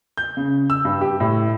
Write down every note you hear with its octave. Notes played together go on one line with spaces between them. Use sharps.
G6
C#3
E6
G2
G4
A2